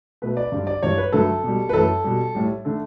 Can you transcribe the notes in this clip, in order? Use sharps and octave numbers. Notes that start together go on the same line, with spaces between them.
B2 A3 B4
D5
G2 D3 G3
D5
G2 E3 G3 C#5
B4
G2 D3 F#3 A3 A4
B2 G3
B4
F#2 E3 A3 A4
B2 G3
A2 G3
D3 A3